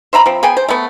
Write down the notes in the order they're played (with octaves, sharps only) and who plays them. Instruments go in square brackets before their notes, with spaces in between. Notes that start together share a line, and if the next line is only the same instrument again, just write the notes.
[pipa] C5 E5 A#5 B5
F3 C4
B3 G#4 G5 G#5
C5
A3 B3